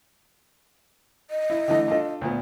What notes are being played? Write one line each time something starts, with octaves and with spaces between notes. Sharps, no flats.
D#5
E4
D3 E3 A3
D4 F4 A4
D2 A#2 B3